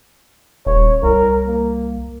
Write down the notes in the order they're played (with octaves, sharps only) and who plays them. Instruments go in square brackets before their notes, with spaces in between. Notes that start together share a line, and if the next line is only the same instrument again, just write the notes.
[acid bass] D#1 [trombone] C#5
[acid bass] C2 [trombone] A#4
[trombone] A#3